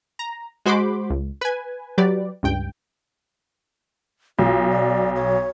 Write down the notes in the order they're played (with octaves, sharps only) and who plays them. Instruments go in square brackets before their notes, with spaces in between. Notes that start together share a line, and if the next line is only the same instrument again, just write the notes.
[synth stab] A#5
G#3 F#4 C5 B5 C6 D6
C#2
B4 G#5
F#3 G4 B4 D5
C#2 G2 G5
[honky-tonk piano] B1 [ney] F4
[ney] D5
C#5